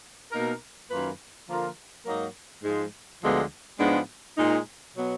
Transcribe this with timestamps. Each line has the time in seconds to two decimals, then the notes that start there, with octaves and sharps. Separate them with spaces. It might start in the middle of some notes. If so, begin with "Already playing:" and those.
0.31 B2 A#3 D#4 A#4
0.90 F#2 D#3 A#3 F4 B4
1.47 D3 F3 A#3 F4 A#4
2.06 G#2 F#3 A#3 D#4 A#4
2.63 G#2 F3 G#3
3.22 D2 D3 F3 G#3 B3
3.79 G#2 F3 G#3 B3 D4
4.38 A#2 G#3 D#4
4.95 B2 F#3 B3